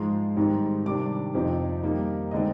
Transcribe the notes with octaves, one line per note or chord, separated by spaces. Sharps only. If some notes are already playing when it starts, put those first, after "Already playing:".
Already playing: G#2 F3 G#3 C6
G#2 D#3 G3 C4 D#4
C3 D#3 G3 D4 D6
F2 C3 F3 C4 D#4
D#3 G3 A#3 D#4
D3 G#3 C4 D#4 D#5